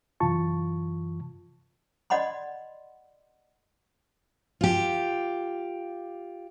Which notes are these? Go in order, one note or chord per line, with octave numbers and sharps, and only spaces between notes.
F#2 C3 E3 F4 A5 C#6
D5 D#5 F#5 B5 C6
F4 G4